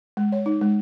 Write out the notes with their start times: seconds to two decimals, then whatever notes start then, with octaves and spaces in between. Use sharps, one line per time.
0.17 G#3
0.32 C#5
0.46 D#4
0.61 G#3